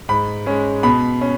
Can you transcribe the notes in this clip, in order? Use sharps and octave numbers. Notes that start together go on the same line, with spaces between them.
G#2 B5
G#3 C#4
B2 B5
C#4